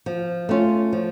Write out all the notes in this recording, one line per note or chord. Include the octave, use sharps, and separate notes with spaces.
F3
A3 C#4 F4
F3